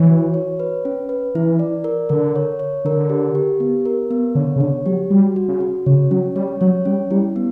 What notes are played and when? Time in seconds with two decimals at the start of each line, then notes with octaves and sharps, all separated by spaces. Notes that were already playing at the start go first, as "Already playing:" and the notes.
Already playing: E3 C#5
0.09 F#4
0.34 C#5
0.60 B4
0.85 C#4
1.09 B4
1.35 E3 E4
1.59 D5
1.84 A#4
2.09 D3 A#4
2.36 C#5
2.59 C#5
2.85 D3 A#4
3.10 G4
3.35 G4
3.60 B3
3.85 A#4
4.11 B3
4.35 D3 C#5
4.56 C#3
4.60 D3 C#5
4.86 F#3 G4
5.10 G3 F#4
5.36 F#4
5.48 C#3
5.61 F#4
5.86 C#3 C#5
6.11 F#3 C#4
6.35 G3 C#5
6.61 F#3 C#5
6.85 G3 C#4
7.11 G3 E4
7.36 B3